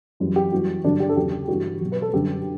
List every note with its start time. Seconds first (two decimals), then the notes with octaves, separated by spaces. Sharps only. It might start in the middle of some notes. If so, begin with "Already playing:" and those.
0.20 F#2 E3 G3
0.36 G4
0.52 F#2 E3 G3 F#4
0.84 G2 D3 F#3 D4
1.00 G4
1.09 A4
1.16 E2 C#3 F#3 G4
1.48 G2 E3 G3 F#4
1.81 B2 F#3
1.92 B4
2.02 A4
2.13 F#2 D3 G3 G4